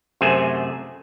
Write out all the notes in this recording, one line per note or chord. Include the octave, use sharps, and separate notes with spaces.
F#2 C3 A3 G#4 C5 G#5